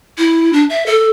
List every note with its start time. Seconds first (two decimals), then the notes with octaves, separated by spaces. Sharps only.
0.18 E4
0.53 D4
0.70 E5
0.86 A4